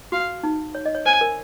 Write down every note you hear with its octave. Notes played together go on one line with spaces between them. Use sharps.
F#4 F5
D#4
C#5
D#5
C#5
C5 G#5
A#4